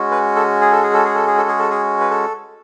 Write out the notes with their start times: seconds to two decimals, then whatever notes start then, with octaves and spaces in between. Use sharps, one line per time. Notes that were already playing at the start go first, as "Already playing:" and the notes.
Already playing: G#3 C#4 F#4
0.11 B4
0.36 A4
0.61 G#4
0.72 A4
0.83 G#4
0.94 A4
1.05 G#4
1.15 A4
1.27 G#4
1.38 A4
1.48 G#4
1.59 A4
1.70 G#4
2.00 B4
2.10 A4